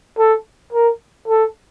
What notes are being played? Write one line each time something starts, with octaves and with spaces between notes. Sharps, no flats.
A4
A#4
A4